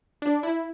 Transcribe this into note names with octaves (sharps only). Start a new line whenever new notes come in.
D4
E4